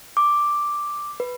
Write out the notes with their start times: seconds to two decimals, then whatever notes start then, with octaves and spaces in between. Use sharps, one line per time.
0.17 D6
1.20 B4